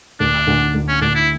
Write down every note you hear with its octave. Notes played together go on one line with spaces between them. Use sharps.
D2 D4
D2
D2
C#4
D2 D4
E4